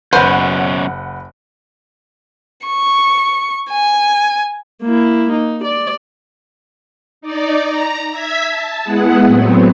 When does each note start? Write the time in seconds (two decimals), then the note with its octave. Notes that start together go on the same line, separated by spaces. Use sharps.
0.13 F#1 F#2 B2 C#4 B4 C5 F#5
2.66 C#6
3.71 G#5
4.83 A#3 E4
5.32 D#4
5.64 D5
7.21 D#4 D5
7.62 A#5
8.11 E5 G#6 B6
8.47 A5
8.83 G#3 B3 E4 G#4 F#5
9.25 A2 F#3 B3 C4